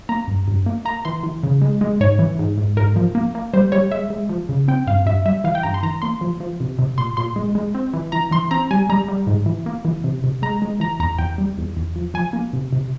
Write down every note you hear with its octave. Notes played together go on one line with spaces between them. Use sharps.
A#3 A#5
G2
G2
A#3
A#3 A#5
E3 C6
E3
C#3
G#3
G#3
G#2 C#5
E3
G#2
G#2
G#2 A#4
F3
A#3
A#3
G3 C5
G3 C#5
G#3 E5
G#3
F3
C#3
C4 G5
G2 F5
G2 E5
G3 E5
E3 F5
G5
G2 A#5
C6
E3 A#5
A#3 C6
F3
F3
C3
C3
A#2 C6
A#2 C6
G#3
G#3
C4
E3
E3 A#5
E3 C6
C4 A#5
G3 G#5
G3 A#5
G3
G#2
E3
A#3
E3
C3
C3
G#3 A#5
G#3
E3 A#5
E2 A#5
E2 G5
G3
E2
E2
F3
F3 G#5
A#3
C3
C3